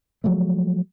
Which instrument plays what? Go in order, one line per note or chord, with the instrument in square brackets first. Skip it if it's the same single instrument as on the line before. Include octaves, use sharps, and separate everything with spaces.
[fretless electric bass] F3 F#3 G#3 A3